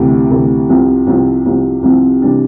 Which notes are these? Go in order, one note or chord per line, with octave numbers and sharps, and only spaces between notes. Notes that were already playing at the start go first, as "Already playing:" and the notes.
Already playing: D2 C3 E3
D2 C3 E3
C2 C3 F3 C4
C2 C3 F3 C4
C2 C3 F3 C4
C2 C3 F3 C4
C3 E3 G3 D4